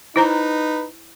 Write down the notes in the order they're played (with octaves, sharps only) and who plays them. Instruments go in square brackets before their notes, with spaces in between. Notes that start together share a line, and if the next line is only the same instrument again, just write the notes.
[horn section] D#4 B4 [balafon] E4 C5 A#5